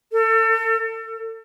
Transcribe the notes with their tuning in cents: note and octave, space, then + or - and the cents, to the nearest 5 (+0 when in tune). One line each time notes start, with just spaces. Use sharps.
A4 +35
A4 +35